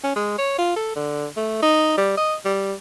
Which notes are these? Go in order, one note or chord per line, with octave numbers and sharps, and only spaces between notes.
C#4
G#3
C#5
F4
A4
D3
A3
D#4
G3
D#5
G3